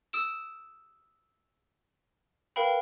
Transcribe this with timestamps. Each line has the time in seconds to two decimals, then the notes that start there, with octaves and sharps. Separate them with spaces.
0.13 D#6 E6 D7 E7
2.56 A#4 B4 F5 G5 B5